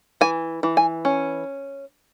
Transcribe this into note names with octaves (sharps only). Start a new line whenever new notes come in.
E3 G#5
E3
G#5
C#4